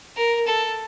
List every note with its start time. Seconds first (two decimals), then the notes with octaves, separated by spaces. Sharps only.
0.16 A#4
0.47 A4